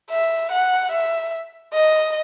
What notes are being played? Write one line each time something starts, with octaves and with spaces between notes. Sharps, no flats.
E5
F#5
E5
D#5